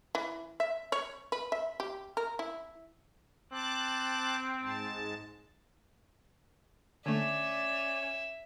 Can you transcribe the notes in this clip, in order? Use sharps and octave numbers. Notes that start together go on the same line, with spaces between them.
E3
E5
C#5
B4
E5
G4
A#4
E4
C4 A5 D6 F#6
G#2 G#3 A5
D3 A3 C#4 D5 E5